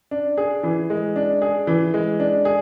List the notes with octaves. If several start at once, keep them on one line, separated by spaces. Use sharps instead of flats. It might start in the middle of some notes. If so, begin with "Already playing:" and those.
D4
G#4
E3
G#3
D4
G#4
E3
G#3
D4
G#4